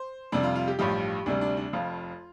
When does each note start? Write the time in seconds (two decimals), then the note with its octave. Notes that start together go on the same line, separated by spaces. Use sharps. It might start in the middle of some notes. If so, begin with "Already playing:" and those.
Already playing: C5
0.32 F2 C3 G3 D4
0.43 F4
0.55 F4
0.68 G4
0.79 A1 G2 F3 G4
1.26 D2 C3 G3 D4
1.41 D4
1.57 D4
1.73 F1 F2 F3 F4